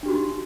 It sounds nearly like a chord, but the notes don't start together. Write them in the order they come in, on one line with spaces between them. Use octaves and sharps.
D4 G4 F#4 D#4